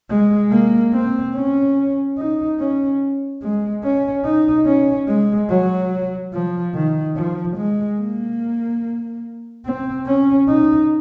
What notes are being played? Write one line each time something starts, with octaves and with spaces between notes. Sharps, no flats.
G#3
A#3
C4
C#4
D#4
C#4
G#3
C#4
D#4
C#4
G#3
F#3
F3
D#3
F3
G#3
A#3
C4
C#4
D#4